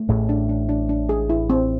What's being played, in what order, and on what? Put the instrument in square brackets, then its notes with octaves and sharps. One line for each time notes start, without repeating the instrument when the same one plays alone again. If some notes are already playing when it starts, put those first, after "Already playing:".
Already playing: [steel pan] A3
[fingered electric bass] A1 A2 [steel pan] G#4
[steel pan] D4
D4
D4
D4
G#4
E4
C4